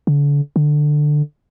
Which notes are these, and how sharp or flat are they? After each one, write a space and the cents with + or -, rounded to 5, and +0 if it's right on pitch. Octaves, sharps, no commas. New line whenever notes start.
D3 -35
D3 +15